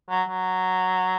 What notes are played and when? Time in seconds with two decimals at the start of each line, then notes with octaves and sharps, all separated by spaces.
0.10 F#3
0.29 F#3